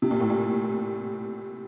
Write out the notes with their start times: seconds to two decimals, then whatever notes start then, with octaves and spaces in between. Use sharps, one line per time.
0.02 C3
0.11 A#2
0.20 A2
0.30 A#2